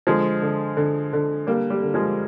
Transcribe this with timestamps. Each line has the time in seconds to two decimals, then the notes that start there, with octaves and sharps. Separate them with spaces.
0.07 D3 F3 G#3
0.42 D3
0.77 D3
1.13 D3
1.47 G3 A#3
1.70 G3
1.83 D3
1.94 F3 G#3